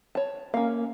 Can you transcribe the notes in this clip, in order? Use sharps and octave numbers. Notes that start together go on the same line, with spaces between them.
C#5 A5
A#3 C#4 F5